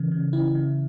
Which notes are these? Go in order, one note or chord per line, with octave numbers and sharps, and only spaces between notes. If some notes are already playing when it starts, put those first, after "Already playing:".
Already playing: C#3 E3
C#3
C#3 E4
C#3